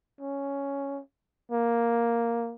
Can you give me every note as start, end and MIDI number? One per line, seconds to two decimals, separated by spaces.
0.21 1.01 61
1.52 2.56 58